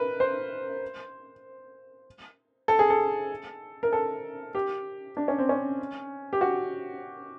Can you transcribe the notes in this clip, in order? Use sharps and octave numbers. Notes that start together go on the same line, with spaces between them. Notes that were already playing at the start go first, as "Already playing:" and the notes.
Already playing: A#4 B4
C5
A4
G#4
A4
A#4
A4
G4
D4
C#4
C4
C#4
G4
F#4